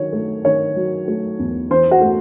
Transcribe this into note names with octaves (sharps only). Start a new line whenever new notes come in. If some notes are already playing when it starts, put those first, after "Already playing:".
Already playing: D#3 F#3 C#5
A3
D#3 C#5
F#3
A3
E2
E3 C5
F#4
A3